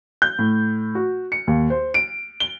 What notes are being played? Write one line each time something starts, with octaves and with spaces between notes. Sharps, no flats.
G6
A2
F#4
C#7
D#2
C5
D7
G7